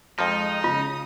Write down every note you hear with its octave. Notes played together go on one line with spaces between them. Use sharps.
F2 F3 G#3 D#4
C#3 F4 D#6